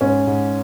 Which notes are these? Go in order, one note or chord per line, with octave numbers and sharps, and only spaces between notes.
G#2 C#4
G#2